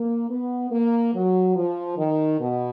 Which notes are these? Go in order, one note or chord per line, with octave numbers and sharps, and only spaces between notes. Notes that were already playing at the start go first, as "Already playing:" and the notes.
Already playing: A#3
B3
A#3
F#3
F3
D#3
B2